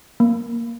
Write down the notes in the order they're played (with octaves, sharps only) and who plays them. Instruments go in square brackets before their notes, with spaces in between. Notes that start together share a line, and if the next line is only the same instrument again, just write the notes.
[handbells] A#3